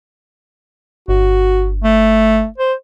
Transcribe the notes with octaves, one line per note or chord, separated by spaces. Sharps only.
G1 F#4
A3
C5